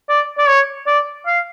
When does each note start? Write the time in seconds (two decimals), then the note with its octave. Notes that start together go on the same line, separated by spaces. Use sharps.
0.09 D5
0.38 D5
0.48 C#5
0.87 D5
1.27 F5